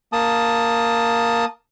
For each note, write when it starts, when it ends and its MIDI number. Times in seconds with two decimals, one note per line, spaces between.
0.13 1.45 58
0.13 1.45 81
0.13 1.45 87